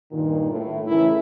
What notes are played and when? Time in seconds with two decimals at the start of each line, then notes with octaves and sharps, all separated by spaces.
0.12 G2 A#2 D#3
0.51 A2
0.87 C#3 E3 A3 E4 A#4